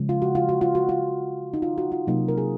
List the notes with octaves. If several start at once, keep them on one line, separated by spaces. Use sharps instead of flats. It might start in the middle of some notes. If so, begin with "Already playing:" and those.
Already playing: C#3 F3 G#3
F4
F#4
F4
F#4
F4
F#4
F4
D#4
F4
F#4
F4
C3 F#3 A#3 D#4
A#4
G#4